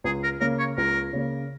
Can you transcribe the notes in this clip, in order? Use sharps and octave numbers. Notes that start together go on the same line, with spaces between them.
C#2 G#4
A#4
C#3 A#3 C#4 A#4
C#5
C#2 A#4
C#3 A#3 C#4